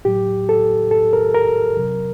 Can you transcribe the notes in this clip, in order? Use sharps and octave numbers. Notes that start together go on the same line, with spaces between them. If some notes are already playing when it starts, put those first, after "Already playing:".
A2 F#3 G4
A4
A4
A#4
A#4
C3 F#3